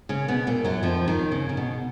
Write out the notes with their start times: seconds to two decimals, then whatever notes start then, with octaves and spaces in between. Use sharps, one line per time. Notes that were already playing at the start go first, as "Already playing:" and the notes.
0.09 C#3 C#4
0.28 B2 B3
0.47 A#2 A#3
0.64 F#2 F#3
0.83 F2 F3
1.07 D#2 D#3
1.32 C#3
1.49 C#3
1.57 B2